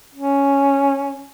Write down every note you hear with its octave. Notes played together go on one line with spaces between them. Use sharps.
C#4